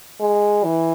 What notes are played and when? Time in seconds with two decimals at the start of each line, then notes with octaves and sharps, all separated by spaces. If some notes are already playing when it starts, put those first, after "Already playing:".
0.20 G#3
0.64 E3